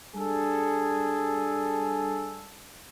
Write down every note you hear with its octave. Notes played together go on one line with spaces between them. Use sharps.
G3 D4 G#4 A4